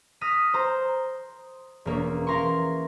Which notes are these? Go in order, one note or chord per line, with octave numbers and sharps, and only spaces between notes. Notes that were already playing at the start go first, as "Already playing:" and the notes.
D#6 F6 F#6 A#6 B6 D#7
C5 A#5
E1 A#3 C#4
E3 A#4 F5 A#5 C6 C#6